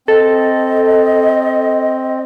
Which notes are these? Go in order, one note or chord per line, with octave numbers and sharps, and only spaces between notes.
C4 A4 D#5